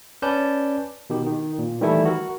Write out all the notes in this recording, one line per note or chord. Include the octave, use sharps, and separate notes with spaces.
C#4 B4 D5 A5 G6
B2 D#3 G4
D#3
A#2
D#3 E3 G3 A3 E4 A4
F#4 A#4